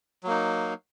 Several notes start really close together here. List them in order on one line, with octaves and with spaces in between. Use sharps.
F#3 A#3 D#4